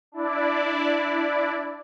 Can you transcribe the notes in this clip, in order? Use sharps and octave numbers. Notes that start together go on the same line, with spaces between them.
D4 E4 D5